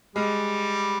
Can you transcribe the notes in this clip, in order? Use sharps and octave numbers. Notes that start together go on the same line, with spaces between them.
G3 G#3